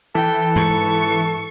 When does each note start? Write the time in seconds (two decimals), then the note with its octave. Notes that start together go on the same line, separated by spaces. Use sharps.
0.15 E3 A4 G5
0.56 G#2 C#6 C#7